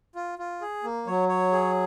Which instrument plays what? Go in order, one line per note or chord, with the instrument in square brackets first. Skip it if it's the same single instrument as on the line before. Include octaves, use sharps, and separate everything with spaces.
[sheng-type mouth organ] F4
F4
G#4
A#3
[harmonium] F#3 [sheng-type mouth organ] C#5
[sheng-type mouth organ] C#5
G#4